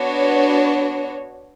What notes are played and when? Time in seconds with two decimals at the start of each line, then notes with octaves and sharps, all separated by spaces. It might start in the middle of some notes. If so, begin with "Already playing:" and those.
Already playing: B3 D4 F#4 C#5